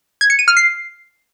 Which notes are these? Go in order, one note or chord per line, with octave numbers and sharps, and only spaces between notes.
G#6
C#7
D#7
F6
C7